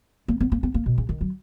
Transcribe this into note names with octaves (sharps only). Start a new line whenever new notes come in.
A#3
B3
A#3
B3
A#3
B2
C#3
D#3
F#3